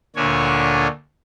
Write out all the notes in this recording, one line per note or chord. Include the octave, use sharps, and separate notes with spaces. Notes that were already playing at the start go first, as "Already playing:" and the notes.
D2 A#2 D3 D4 C#5 G#5